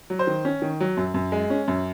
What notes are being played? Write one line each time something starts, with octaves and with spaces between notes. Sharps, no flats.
F#3
C5
D#3
C#4
D#3
F#3
F#2
F#2
G#3
C#4
F#2